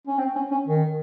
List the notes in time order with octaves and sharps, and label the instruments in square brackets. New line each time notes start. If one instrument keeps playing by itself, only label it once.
[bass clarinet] C#4
C4
C#4
C#4
D#3